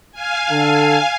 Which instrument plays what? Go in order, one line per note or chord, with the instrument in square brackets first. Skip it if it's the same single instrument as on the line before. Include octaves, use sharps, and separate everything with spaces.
[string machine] F5 G#5
[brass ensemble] D3 A4